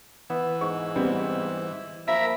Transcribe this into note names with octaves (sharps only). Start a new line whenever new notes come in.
E3 B3
G#2 C#6
G3 B3 C4
F3 A#3 A#4 E5 B5